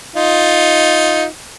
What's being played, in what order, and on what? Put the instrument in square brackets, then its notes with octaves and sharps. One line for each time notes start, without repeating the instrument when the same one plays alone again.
[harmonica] D#4 F4